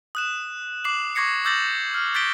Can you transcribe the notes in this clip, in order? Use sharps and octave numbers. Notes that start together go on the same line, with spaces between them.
D#6 F#6 E7
D6 C7 E7 F#7
C#6 D6 G#6 A#6 C7 C#7
D6 E6 G6 A6 A#6 F#7
F6
F#6 G6 A6 B6 D7 G7